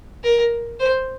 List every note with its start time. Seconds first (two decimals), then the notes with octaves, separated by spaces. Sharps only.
0.23 A#4
0.79 C5